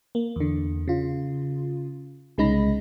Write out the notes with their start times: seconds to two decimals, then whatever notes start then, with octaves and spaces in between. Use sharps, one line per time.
0.15 A#3
0.36 E2 D3
0.88 C#3 F4
2.38 C2 C#3 G#3 D#4 B5 A#6